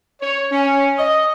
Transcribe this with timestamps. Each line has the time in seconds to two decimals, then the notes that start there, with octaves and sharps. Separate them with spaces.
0.22 C#5
0.52 C#4
0.98 D#5